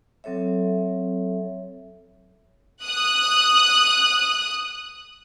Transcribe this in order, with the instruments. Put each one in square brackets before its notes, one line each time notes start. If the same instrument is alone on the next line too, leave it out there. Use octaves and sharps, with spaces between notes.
[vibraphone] F#3 C4 A4 C#5 E5
[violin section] D#6 F#6